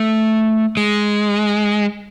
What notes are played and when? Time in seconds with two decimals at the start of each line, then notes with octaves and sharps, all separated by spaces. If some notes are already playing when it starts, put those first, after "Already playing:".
Already playing: A3
0.77 G#3